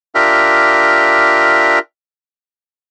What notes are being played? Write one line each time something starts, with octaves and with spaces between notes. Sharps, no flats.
D4 F4 G4 A#4 E5